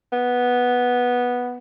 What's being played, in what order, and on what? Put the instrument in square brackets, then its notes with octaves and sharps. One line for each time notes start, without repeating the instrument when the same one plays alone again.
[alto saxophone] B3